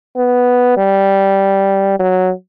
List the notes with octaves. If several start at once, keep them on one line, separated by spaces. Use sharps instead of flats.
B3
G3
F#3